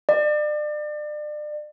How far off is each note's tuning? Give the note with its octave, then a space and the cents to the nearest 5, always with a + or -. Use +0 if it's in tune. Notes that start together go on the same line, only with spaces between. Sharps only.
D5 +35